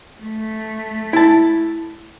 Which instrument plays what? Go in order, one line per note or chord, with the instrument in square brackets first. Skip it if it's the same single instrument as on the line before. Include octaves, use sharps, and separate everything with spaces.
[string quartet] A3
[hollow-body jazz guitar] E4 A5